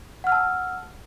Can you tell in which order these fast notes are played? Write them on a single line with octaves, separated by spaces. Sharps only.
F#5 F6 E6 A5